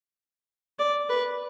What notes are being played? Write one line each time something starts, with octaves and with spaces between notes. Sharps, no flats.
D5
B4